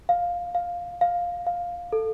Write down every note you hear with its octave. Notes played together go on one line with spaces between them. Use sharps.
F5
F5
F5
F5
A4